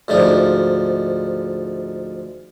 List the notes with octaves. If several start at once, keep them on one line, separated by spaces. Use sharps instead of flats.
D2 G#2 F3 D4